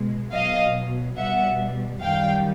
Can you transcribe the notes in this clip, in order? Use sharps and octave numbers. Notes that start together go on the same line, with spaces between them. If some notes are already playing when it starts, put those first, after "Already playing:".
Already playing: B2 G#3
B2 F#3 D#5 F5
B2 G3 E5 F#5
F#2 D#3 G3 F5 G5